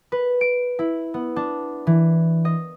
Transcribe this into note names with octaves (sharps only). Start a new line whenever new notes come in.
B4
D7
E4
B3
D4
E3
D#5